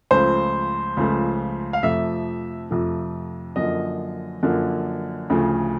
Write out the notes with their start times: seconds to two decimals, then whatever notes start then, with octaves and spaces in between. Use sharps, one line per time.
0.11 C#2 C#3 F3 A3 C5
0.97 C#2 C#3 F3 A3
1.73 F5
1.83 F2 C3 F3 A3 E5
2.71 F2 C3 F3 A3
3.56 F#2 D3 F3 A#3 D#5
4.43 F#2 D3 F3 A#3
5.30 D2 C#3 F3 A3